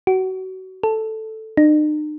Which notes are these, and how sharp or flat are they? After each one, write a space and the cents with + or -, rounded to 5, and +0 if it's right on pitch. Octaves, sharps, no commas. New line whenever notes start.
F#4 +25
A4 +0
D#4 -45